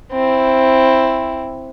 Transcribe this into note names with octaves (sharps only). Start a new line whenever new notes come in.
C4 E4